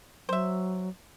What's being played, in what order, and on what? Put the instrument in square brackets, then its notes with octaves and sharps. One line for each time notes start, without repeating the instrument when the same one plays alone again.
[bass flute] F#3 [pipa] C5 E5